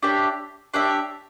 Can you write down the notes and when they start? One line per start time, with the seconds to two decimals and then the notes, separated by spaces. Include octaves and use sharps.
0.03 D4 G4 C#5 E5
0.74 D4 G4 C#5 E5